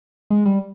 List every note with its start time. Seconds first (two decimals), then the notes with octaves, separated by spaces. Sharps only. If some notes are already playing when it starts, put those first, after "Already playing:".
0.30 G#3
0.45 G3